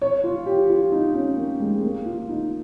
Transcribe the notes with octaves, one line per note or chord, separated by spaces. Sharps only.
C#5
F4
G4
F4
D#4
C#4
A#3
G#3
A#3
F4
D#4